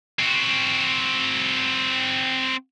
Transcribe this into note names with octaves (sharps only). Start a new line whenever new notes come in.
C4 F#4